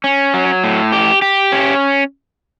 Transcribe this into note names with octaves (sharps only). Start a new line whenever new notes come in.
C#4
F#3
A2
G4
G4
C#4